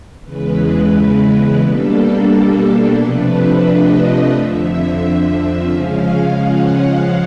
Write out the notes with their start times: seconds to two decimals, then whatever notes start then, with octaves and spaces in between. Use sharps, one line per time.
0.23 E2 C#3 E3 G#3 B4
1.59 B2 G3 A#3 D4 A4
2.96 C3 F3 A3 D4 B4
3.63 D#5
4.31 F2 D3 F3 E5
5.67 C#3 F3 G#3 C#4 F5
6.35 F#5